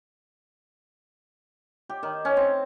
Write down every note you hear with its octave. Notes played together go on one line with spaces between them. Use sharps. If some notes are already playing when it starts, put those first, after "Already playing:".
G4
D#3
C#4
C4